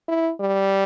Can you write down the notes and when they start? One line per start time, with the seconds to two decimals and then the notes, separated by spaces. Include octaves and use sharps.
0.08 E4
0.40 G3